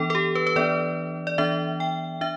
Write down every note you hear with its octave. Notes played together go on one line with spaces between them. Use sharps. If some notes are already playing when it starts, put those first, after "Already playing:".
Already playing: E3 B3 D4 A4
A4
G4
B4
B4
E3 B3 D4 D5
D5
E3 B3 D4 E5
G5
D4 E5